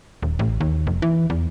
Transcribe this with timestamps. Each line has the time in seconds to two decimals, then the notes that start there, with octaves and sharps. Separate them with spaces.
0.23 D#1
0.39 A1
0.61 D#2
0.87 F1
1.02 E3
1.30 E2